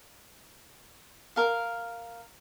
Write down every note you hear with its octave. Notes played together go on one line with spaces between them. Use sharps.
A#4 F5